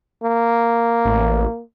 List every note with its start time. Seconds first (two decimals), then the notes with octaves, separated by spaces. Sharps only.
0.23 A#3
1.05 A1